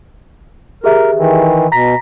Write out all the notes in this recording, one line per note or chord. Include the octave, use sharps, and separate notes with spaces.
G4 G#4 A#4 E5
D#3 E3
B2 A#5 A#6 B6